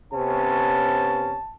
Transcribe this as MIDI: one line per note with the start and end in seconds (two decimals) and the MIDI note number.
0.13 1.36 48
0.13 1.36 59
0.13 1.36 61
0.13 1.56 81